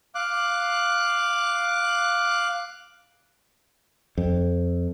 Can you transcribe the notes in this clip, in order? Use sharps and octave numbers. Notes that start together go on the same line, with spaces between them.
F5 D6 F#6
F2